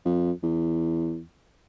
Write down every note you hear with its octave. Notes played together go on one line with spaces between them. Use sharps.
F2
E2